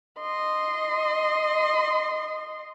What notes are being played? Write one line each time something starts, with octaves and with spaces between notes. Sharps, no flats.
D#5 C6